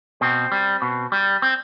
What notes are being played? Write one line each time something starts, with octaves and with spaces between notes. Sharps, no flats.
B2 C4
G3
B2
G3
C4